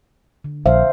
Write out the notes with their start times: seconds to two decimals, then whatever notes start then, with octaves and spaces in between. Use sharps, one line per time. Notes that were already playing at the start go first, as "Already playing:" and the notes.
0.44 D3
0.66 A#1 C5 E5 F5